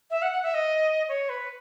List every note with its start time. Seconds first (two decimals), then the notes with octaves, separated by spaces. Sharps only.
0.10 E5
0.22 F#5
0.33 F#5
0.43 E5
0.54 D#5
1.08 C#5
1.29 B4